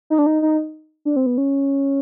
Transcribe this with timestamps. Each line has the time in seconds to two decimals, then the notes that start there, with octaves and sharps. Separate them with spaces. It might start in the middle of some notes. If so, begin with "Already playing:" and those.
0.10 D#4
0.18 D4
0.26 D#4
0.42 D#4
1.05 D4
1.16 C4
1.26 B3
1.38 C#4